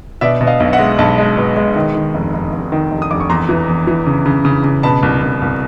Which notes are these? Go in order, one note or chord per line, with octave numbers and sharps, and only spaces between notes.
B2 D5 E5
B2
D#5 F5
B1
E5 F#5
G#3
B1 A5 B5
G#3
B2
G#3
D#3
D#3
F1
F1
F1
D#3
F1
D#6
F1 D6
C#6
E2 A#5 C6
E3
E2
E3
C#3
C#3
C#3
C#3
B2 A5 B5
C2
C2
C2